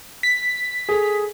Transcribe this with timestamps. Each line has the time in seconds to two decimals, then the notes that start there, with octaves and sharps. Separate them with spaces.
0.23 B6
0.89 G#4 A4